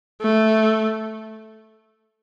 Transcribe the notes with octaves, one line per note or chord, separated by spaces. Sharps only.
A3